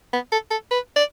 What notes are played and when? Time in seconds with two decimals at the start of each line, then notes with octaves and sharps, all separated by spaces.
0.13 B3
0.32 A4
0.51 A4
0.71 B4
0.96 D5